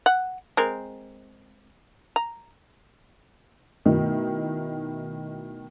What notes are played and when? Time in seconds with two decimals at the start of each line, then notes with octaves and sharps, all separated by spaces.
0.06 F#5
0.57 G#3 C4 A#4
2.16 A#5
3.85 B2 D#3 A3 E4